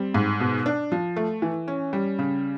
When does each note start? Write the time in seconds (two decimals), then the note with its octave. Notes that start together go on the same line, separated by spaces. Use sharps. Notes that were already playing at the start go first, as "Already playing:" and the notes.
Already playing: G3 C4
0.14 G#2
0.40 B2
0.66 D4
0.92 F3
1.16 A3
1.42 E3
1.68 C#4
1.93 G3
2.19 C#3